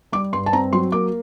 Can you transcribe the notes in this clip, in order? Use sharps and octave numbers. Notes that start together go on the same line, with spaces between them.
G3 D6
G2 C6
A5
C4 A#5
F#3 C6
A#3 D6